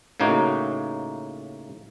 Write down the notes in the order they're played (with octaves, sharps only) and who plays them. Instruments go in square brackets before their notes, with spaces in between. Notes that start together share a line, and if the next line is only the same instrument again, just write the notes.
[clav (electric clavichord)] A2 C#3 A#3 D#4 F#4